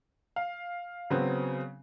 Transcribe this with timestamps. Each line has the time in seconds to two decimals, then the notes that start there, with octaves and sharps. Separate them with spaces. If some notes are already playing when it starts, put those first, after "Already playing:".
0.36 F5
1.10 C#3 F#3 B3 C4